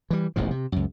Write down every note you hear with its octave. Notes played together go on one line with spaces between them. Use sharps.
E3 G3
E1 A1 G#2 F3
C3
C#2 F#2